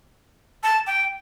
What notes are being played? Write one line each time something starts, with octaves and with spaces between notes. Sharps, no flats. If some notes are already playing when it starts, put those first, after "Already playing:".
A5
G5